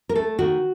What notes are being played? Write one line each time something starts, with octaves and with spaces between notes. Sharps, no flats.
A#4
A3 A4
D#3 F#4